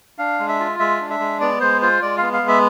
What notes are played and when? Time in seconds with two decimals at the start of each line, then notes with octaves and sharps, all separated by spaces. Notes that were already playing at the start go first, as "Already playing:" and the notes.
0.18 D4 F5
0.39 G#3
0.49 E5
0.60 F4
0.79 G#3 E5
1.01 D4
1.10 E5
1.20 G#3
1.40 B3 D5
1.61 G#3 C5
1.82 F4 C5
2.02 G#3 D5
2.17 B3 F5
2.33 F5
2.42 G#3
2.48 E5